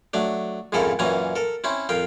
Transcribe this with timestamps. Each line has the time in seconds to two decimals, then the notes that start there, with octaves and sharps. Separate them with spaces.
0.14 F#3 A3 D4
0.72 F2 G#2 C#3 E4 A4 A#4
0.99 F#2 A#2 E3 C#4 G#5 A#5
1.36 A4 A#4
1.64 C4 C#4 E4
1.89 F2 A#4 F5 G5